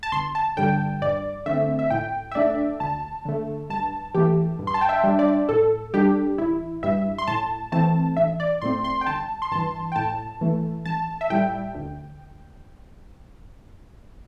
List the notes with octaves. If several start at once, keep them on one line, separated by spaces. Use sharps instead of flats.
A5
G1 C6
A5
G2 D3 G3 G5
G2 D5
D3 A3 C4 E5
E5
A2 G5
E5
A3 D4 D5
D2 A5
D3 A3
G2 A5
E3 A3 G4
G2
C6
A5
G5
E5
G3 D4
D5
A2 A4
G3 D4 G4
A1 E4
G2 G3 E5
C6
A2 A5
E3 A3 C4 A5
A1 E5
D5
A2 A3 C4 C6
C6
G5
G1 A5
C6
G2 E3 A5
G5
A2 A5
E3 A3
A1 A5
E5
A2 G3 G5
D2